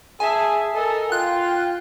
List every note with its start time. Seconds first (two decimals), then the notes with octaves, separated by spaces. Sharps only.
0.20 G#4 E5 G#5 A5
0.74 A4 A#4 D#5
1.12 F4 G5 F#6